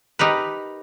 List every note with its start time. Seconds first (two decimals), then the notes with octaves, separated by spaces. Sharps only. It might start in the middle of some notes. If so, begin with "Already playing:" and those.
0.19 D#4 G4 A#4 B4